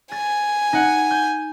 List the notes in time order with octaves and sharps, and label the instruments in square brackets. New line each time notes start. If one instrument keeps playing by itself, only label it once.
[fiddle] G#5 [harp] A6
[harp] D#4 F#5
G6